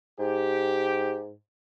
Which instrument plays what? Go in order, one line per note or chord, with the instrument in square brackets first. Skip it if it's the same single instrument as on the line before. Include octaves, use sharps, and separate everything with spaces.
[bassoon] G#2 [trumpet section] G4